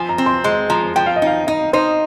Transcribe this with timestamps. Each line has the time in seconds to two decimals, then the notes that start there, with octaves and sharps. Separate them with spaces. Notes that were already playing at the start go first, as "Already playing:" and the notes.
Already playing: F3 G#5
0.09 A#5
0.18 C4
0.26 C6
0.44 G#3 C6
0.70 F3 A#5
0.96 F3 G5
1.06 F5
1.16 D#5
1.22 D#4 F5
1.47 D#4 D#5
1.73 D#4 C5